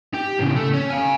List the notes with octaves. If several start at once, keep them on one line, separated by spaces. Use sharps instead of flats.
G4
A2 C#3
A3
C#4
F5 G#5